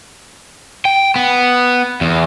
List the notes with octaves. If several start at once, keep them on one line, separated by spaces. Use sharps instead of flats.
G5
B3
E2